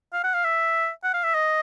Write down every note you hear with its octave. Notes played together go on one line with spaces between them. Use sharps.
F5
F#5
F5
E5
F#5
F5
E5
D#5